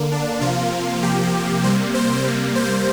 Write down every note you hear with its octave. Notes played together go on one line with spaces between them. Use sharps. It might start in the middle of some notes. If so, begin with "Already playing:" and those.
Already playing: D3 A#3
D4
C3 F3 A#3 F4
C3 F3 A#3 G4
C3 G3 A#3 C5
C5
C3 G3 A#3
C5